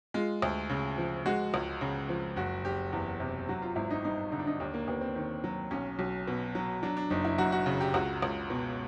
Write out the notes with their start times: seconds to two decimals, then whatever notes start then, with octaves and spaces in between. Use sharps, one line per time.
0.14 G#3 F4
0.42 D2
0.69 C#3
0.98 F3
1.26 G#3 F#4
1.54 C#2
1.81 C#3
2.09 F3
2.36 F#1 F#4
2.64 F#1 G4
2.92 E2
3.20 C3
3.49 F#3 F#4
3.62 F4
3.76 G#1 E4
3.90 D#4
4.04 G2 D#4
4.32 D3 D#4
4.39 D4
4.47 D#4
4.60 D#2 D4
4.74 A#3
4.88 D#2 B3
5.01 C4
5.15 D#3
5.44 F#3
5.71 B1 C#4
5.99 B1
6.27 B2
6.55 F#3
6.83 F#3 D4
6.97 D4
7.10 F#1 D#4
7.25 E4
7.38 F#2 F#4
7.52 F#4
7.66 C#3
7.80 G4
7.94 C#2 F#4
8.22 C#2
8.50 B2